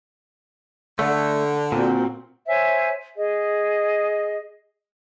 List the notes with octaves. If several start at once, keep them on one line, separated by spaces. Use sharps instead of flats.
D3 A3
A#2 C4 F#4
C5 C#5 E5 G#5
G#4 D#5